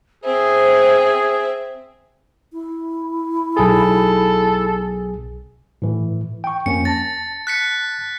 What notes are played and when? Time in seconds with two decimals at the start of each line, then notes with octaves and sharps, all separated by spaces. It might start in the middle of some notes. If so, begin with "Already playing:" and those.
0.24 C4 G#4 C5 E5
2.52 E4
3.57 B1 G#4 A4
5.82 A2 E3
6.44 G5 C#6
6.66 F2 A#3 C#4 C#7
6.85 A5 A6 A#6
7.47 F#6 B6 C#7